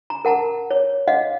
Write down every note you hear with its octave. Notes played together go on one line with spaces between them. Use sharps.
A#5
A#4 F#5 A5 A#5
C#5
D#5 F5 F#5